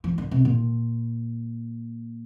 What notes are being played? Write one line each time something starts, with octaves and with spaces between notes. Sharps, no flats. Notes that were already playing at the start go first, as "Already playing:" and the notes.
F3
D3
C3
A#2